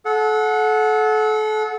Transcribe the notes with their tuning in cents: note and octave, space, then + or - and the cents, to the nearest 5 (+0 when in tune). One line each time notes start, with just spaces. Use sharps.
A4 -30 F#5 -15